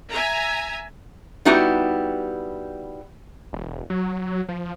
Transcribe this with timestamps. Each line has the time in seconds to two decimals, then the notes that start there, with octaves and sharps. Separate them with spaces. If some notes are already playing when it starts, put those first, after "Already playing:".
0.11 E5 G#5 A#5
1.45 G3 B3 D#4 E4 F#4 G4
3.53 E1
3.90 F#3
4.49 F3